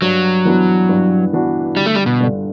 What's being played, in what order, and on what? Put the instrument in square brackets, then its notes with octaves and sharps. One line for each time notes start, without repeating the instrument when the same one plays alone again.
[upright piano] G2 [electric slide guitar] F#3
[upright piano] E3 B3 D4 F#4
G2
E3 B3 D4 F#4
[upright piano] G1 [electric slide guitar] G3
[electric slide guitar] A3
G3
B2
[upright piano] G2 D3